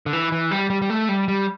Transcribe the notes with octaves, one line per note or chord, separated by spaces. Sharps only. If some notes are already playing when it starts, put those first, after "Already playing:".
D3
E3
E3
G3
G3
G3
A3
G3
G3